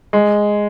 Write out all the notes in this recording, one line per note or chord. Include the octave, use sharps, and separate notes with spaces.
G#3